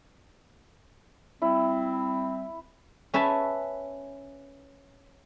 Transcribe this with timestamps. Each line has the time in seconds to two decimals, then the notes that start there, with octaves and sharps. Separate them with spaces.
1.42 G3 C4 E4
3.14 C#4 B4 E5 G#5 A5